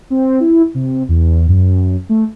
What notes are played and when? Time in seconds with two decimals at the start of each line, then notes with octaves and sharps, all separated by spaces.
0.10 C4
0.40 E4
0.74 C3
1.08 E2
1.48 F#2
2.09 A3